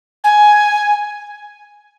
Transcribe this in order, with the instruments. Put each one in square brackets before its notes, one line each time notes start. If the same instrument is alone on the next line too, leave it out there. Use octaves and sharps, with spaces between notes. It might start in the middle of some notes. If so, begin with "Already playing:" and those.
[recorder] G#5